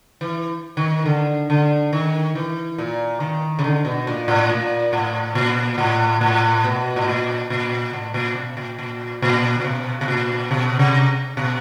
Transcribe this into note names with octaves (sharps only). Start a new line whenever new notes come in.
E3
D#3
D3
D3
D#3
E3
A#2
D#3
C#3
D3
B2
A#2
A2
A#2
A2
A#2
A2
A2
B2
A2
A#2
A#2
A2
A#2
B2
A#2
A#2
A#2
A#2
B2
B2
A#2
B2
C3
B2